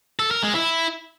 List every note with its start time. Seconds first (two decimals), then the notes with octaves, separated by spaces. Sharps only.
0.19 A4
0.31 A#4
0.43 G#3
0.54 E4